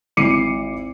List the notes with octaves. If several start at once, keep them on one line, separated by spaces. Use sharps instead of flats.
G#1 E4 D6 C7 C#7 D#7